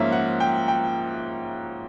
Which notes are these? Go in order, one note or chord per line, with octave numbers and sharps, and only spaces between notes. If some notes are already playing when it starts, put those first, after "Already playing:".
Already playing: G#2 F3 A#3 C#4 E5
F#5
G5
G5